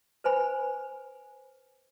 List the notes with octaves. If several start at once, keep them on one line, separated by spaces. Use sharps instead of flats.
B4 C5 G#5 B5